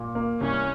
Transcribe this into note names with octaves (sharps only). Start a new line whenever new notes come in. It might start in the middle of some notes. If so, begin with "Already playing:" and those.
Already playing: A#2
A#3
C2 C#4